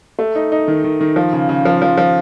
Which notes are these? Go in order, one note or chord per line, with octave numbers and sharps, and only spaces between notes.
A3
D#4
D#4
D#3
D#3
D#3
F3
C#3
C#3
F3
F3
F3